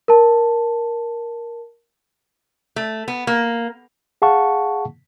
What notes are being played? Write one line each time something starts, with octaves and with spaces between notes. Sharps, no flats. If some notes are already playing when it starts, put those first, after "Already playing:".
A#4 A5
A3
B3
A#3
G#4 F5 F#5 A5 C#6